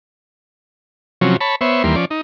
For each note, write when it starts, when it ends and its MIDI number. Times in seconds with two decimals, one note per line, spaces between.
1.21 1.37 48
1.21 1.37 53
1.21 1.37 54
1.21 1.37 61
1.41 1.56 73
1.41 1.56 81
1.41 1.56 83
1.61 1.83 59
1.61 1.83 72
1.61 1.83 73
1.61 1.83 76
1.84 1.96 39
1.84 1.96 52
1.84 1.96 55
1.84 1.96 58
1.84 1.96 84
1.96 2.05 53
1.96 2.05 61
1.96 2.05 74
2.10 2.21 63